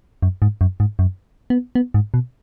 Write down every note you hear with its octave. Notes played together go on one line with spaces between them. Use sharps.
F#2
G#2
F#2
G#2
F#2
B3
B3
G#2
B2